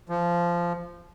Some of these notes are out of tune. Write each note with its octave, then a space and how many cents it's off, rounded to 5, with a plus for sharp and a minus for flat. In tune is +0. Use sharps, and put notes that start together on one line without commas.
F3 -15